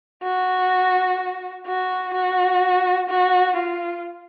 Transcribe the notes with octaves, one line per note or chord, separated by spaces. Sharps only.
F#4
F#4
F#4
F#4
F4